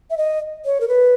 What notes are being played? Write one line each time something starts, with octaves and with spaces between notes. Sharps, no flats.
E5
D#5
C#5
A#4
B4